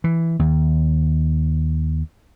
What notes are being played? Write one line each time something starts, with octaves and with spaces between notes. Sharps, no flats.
E3
D#2